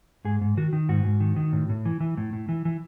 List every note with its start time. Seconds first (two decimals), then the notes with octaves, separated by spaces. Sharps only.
0.25 G#2 G#4
0.41 G#2
0.57 D#3 F#4
0.73 D#3
0.89 G#2 F#4
1.04 G#2
1.20 D#3
1.36 D#3
1.53 A2
1.69 A2
1.85 E3
2.00 E3
2.17 A2
2.33 A2
2.49 E3
2.65 E3